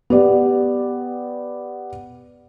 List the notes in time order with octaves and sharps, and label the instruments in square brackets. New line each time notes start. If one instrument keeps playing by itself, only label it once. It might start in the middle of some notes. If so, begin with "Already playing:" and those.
[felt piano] B3 G4 D5